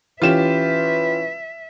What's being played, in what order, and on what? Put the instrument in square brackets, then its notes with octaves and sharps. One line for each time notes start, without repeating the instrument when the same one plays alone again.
[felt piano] E3 C#4 [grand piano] F4 G4 E7 [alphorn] B4 [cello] E5